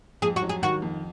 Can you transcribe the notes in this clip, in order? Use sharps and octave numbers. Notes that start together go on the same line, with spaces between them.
F2 G#4
F#4
F#3
G#4
D#3 F#4
F2